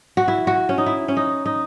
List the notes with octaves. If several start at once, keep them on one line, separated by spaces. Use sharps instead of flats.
F#4
E4
F#4
C#4
D#4
E4
C#4
D#4
D#4